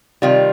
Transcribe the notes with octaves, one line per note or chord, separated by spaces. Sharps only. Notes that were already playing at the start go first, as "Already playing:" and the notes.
C3 D#3 G3 F4